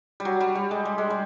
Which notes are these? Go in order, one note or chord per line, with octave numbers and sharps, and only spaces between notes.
G3
F#3
G3
G3
G#3
G3
G#3
G3